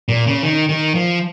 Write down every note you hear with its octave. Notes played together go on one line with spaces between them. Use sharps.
A#2
C#3
D#3
D#3
F3